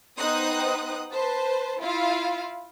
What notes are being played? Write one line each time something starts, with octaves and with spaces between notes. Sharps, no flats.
B3 D#4 C5 G5 D#6 F#6
B4 C5 A5
E4 F4 F5